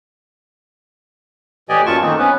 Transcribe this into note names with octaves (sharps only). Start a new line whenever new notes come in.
A2 E3 G4 D5 D#5 G#5
F#2 A#2 F4 A5 C#6
D#3 E3 A3 A#3 C4 D#4
B3 C#4 B4